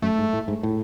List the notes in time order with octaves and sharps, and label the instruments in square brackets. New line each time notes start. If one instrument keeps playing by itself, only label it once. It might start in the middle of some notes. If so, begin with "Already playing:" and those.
[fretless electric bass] F#2 [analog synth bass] A3
[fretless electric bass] G#2
A2
G#2
A2